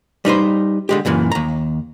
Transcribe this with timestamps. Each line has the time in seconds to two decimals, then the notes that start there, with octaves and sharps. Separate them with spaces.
0.25 G3 D#4 B4 C5
0.89 D3 G#3 G4
1.05 C#2 F#2 A#2 E3
1.32 D#2 A#5